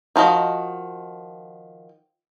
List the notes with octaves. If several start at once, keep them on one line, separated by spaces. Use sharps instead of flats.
D#3 F3 F#4 D#5